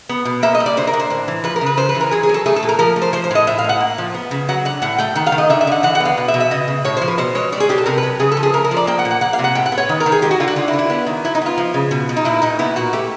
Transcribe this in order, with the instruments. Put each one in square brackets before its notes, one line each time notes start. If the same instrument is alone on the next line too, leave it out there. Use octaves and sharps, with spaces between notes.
[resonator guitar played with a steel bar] B3
B2
A#3 E5
D#5
G3
D5
D3 C5
A#4
D3
C5
A2
E3
F3 B4
A#4
C#3
B4
C#3 C5
B4
E3
A#4
F#3 G#4
G#4
F#3
A4
A3 G#4
A4
A#2
A#4
F3 A#4
A3
C5
F3 C5
C5
A2 D#5
A2 E5
F5
A2 F#5
A#3
F3
B3
C#3
F#3 F#5
D3 F#5
A2 F#5
A3 G5
D#3 F#5
F5
D#3
D#5
D3 E5
E5
D3 F#5
E3 F#5
F#5
B3
F5
B2
E5
B2
E5
C#3 D#5
C#3
A2 C#5
F3 C5
B4
B2 C5
G#3 C#5
G3 D5
G#4
B2 G4
A4
C3 A#4
B4
F#3
C#3 G#4
A4
F3
G#4
A3 A#4
A#4
F3
D5
A#3 G5
F#5
A#2
F#5
A#3 F#5
F5
C3
F#5
A2 G5
F#5
B3
C#5
D#3
A#4
D#3
G#4
G#3 G4
F#4
D3 F4
F#4
D3 F4
E4
D3
E4
B3
D#3
F#3 E4
D#4
B3 F4
F3
C#3
B2
B2
D#4
A#2 E4
A#2 D#4
B3 E4
A#2 F#4
A3 G4